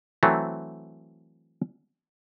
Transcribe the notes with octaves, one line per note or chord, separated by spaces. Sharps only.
E3 F#3 A3 C4